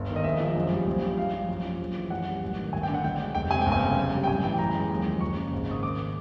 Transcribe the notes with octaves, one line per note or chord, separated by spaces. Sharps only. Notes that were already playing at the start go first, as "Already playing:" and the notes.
Already playing: G1
D#3
D#5
A#1 E5
F3
F#2
G3
A#1
F3
G2 F5
F3
F#2
F3
A#1
E3
F#2 F#5
G3
A1
D#3
G1 G#5
G5
D3
F#5
B1 G5
G#3
F1 G5
C3 G#5
G1 G5
G#5
C#3
F#2
G3
G5
A1 G#5
E3 G5
F#2 A#5
G#3
D#2
F3
F#1 C#6
C#3
G#1
D#3 D#6
G#2 D6
G#3